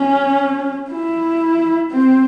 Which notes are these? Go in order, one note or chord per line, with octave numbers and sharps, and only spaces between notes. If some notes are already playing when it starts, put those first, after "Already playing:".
Already playing: C#4
E4
C4